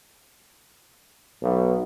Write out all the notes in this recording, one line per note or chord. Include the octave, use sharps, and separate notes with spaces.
B1